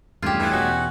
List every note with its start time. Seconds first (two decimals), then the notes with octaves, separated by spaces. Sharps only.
0.22 E2 G2 C#3 G3 A3 F4 G4 G#4
0.40 E3
0.52 E2 B2 C#4 D#4 F#4